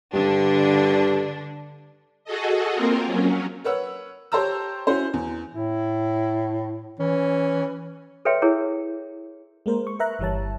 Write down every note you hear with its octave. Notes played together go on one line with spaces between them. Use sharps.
G2 D3 D4
F#4 G#4 A4 D#5
A#3 C4 F4 A#4
F#3 C#4
A#4 B4 C#5 F#5 E6
G4 C5 C#5 A5 A#5 E6
C#4 E4 F#4 C5
E2
A2 E4
E3 C#4
A4 B4 C#5 E5 G5 C6
E4 G#4 A#4 C#5
G#3 A#3 A#4 C5
C#6
A#4 B4 E5 A#5 F#6
G1 E3 G3 C#5 A5